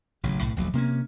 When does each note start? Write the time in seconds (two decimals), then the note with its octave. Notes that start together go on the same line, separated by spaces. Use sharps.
0.23 A1 C#3 F#3
0.40 B1 A2
0.56 D#1 A#1 F#3 A3
0.73 C3 A#3 C#4